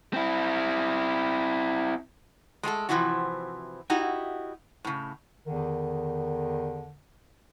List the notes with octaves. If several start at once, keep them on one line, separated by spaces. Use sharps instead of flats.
C4 E4
G#3 A3 G4 A4
C3 E3 F3 C4 E4 F#4
D#4 E4 F#4 G4
A2 C#3
E2 D3 D#3